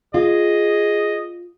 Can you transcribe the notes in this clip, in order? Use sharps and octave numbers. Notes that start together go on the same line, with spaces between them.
F4 G#4 D#5